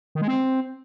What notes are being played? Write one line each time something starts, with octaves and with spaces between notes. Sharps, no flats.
D#3
G#3
C4